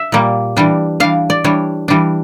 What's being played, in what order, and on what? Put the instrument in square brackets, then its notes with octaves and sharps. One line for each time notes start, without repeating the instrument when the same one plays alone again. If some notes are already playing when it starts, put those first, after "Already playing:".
Already playing: [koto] E5
A#2 G3 A#3
E3 G3 D4
E3 G3 D4 F5
D5
E3 G3 D4 C#5
E3 G3 D4